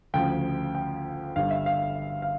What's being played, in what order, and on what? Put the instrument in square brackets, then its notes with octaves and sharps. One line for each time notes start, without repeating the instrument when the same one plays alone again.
[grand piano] D2 C#3 F3 G5
G5
G1 G2 D3 G3 F5
E5
F5
F5